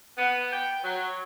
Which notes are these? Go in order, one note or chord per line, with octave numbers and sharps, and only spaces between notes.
B3
G5
F#3